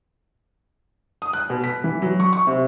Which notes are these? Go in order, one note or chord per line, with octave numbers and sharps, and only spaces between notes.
D#6
F#6
B2
B6
E3
F#3
C#6
C#6
C3